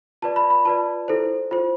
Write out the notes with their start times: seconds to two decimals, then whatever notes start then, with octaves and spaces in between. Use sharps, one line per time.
0.22 F4 B4 D5 A5
0.36 B5
0.50 B5
0.65 F4 B4 D5 A5
1.08 E4 A4 C5
1.51 F4 C5